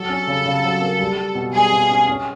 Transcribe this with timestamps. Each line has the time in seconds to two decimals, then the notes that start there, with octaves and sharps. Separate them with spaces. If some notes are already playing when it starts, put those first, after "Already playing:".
Already playing: F#3 A4
0.09 C#4
0.27 C#3
0.46 C#3
0.63 F#3
0.81 A#3
0.99 G3
1.17 G3
1.35 B2
1.53 G3 G#4
1.72 B2
1.90 C#4
2.07 C#4